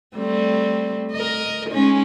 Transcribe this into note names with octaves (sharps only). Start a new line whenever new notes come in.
G3 A3 C4
A#4 D#5
G#3 C#4 D#4